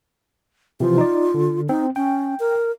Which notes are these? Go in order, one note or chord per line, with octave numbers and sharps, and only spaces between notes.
C3 E3 F3 F4
D#4 D5
D3
C4 D#4
C#4 G5
A#4